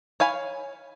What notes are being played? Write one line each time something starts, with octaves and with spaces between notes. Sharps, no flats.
C#5 F5 G#5 B5